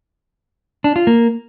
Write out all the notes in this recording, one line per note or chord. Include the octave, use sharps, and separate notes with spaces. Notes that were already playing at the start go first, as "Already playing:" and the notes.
D4
F4
A#3